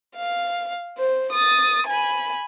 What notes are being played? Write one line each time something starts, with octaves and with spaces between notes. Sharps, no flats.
F5
C5
D#6 A6
G#5 B5